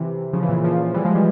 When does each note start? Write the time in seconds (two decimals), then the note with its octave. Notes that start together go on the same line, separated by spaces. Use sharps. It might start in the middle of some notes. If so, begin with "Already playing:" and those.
Already playing: C3 E3
0.33 C#3 F3
0.43 E3
0.49 A#2 C#3
0.64 C#3 F3
0.86 F3
0.94 E3 G3
1.05 F3 G#3
1.15 E3 G3